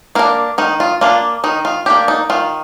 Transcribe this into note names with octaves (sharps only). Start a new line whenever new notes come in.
A#3 D4 A#4
D#3 D#4
F4
A#3 D4 F4
D#3 D#4
F4
A#3 D4 G4
D#4
D#3 F4